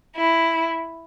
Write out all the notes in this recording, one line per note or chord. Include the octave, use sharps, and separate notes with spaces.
E4